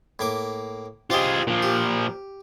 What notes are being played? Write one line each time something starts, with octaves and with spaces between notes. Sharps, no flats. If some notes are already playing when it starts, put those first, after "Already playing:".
A2 A#3 D6
C4 F4 G4 G#4 D#5
A#2 F3
G4